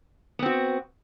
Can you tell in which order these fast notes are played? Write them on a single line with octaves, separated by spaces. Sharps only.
B3 C4 F#4